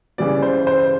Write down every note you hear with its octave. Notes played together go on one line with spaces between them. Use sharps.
C#3 E3 G3 D5
C5
C5